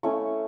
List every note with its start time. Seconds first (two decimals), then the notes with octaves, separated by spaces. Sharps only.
0.03 A3 C#4 E4 C#6